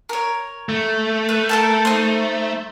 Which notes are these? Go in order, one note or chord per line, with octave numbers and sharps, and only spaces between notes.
A#4 C#5
A3
B4
A4 A#4 A5
D#4 C5